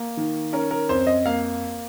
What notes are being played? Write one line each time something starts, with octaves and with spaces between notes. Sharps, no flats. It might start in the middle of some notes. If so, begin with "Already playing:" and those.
Already playing: A#3
D#3
C#4 A#4
A#4
F2 C5
D#5
A#3 F5